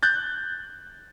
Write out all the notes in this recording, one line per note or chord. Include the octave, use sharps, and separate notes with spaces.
F#6 G6 A6